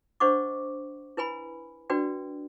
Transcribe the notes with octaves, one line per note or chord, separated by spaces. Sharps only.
D4 C5 D#5 F#5 C#6 D6
E4 B4 G#5 B5
D4 F#4 B4 D5 G5